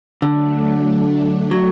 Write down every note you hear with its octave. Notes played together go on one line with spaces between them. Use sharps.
D3 F#3 A3 D4
F#3